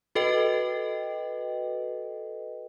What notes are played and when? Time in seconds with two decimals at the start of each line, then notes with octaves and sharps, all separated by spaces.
0.15 F#4 A4 B4 D#5 G5